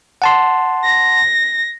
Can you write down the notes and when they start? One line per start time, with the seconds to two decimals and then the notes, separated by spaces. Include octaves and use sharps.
0.22 F#5 A5 C6
0.85 A#6